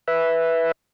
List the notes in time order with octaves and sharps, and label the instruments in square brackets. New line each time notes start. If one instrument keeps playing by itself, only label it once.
[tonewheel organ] B4 E5